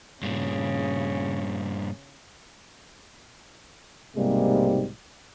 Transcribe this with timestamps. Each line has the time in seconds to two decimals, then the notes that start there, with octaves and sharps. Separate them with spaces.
0.23 G2 A#2 C#3
4.16 B1 G#2 C3 G3 G#3 A#3